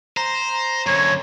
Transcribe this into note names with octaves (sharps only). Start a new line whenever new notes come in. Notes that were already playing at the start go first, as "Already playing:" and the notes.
C5 A#5
F#2 D3 C#5